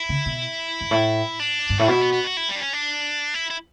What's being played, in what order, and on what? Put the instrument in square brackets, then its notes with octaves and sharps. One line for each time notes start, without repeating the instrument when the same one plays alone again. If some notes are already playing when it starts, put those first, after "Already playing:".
Already playing: [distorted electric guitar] E4
[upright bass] C#3
B2
G2
A2
[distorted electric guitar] D4
[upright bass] G2
[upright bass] A2 [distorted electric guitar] F#4
[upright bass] B2 [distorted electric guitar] E4
[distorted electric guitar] B3
B3
F#4
E4
G3
D4
C#4
D4
E4
E4